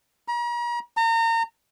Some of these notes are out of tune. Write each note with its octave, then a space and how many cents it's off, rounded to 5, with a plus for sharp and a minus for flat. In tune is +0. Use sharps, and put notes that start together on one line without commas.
A#5 +40
A#5 -35